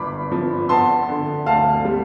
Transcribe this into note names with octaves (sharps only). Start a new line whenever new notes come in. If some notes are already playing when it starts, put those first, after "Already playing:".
Already playing: G1 G2 B5 D6
F3
B3 A5 C6
D3
D2 F5 A5
G3